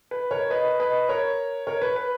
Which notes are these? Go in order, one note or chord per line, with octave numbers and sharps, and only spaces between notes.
B4
A#4 C#5
B4 D#5
B4 D#5
A#4 C#5
A#4 C#5
B4
B4